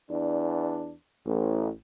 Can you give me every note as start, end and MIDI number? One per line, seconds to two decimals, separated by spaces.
0.10 0.93 40
0.10 0.93 62
1.25 1.68 33